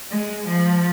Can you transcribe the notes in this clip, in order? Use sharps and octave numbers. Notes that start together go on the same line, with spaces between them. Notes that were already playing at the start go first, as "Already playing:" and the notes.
G#3
F3